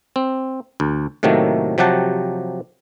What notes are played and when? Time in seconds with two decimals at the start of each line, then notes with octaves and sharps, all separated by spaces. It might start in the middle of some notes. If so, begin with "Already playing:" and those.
0.16 C4
0.80 D2
1.23 A2 C3 D#3 F#3 A3 A#3
1.78 C3 F3 F#3 G4 F#5 A5